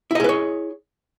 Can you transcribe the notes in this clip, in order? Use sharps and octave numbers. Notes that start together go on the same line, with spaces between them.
E4 G#4 B4 C#5 D#5